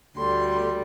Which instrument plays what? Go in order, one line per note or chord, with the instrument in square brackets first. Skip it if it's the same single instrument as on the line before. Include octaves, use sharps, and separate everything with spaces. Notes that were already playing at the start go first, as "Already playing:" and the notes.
[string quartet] D2 D3 G3 C6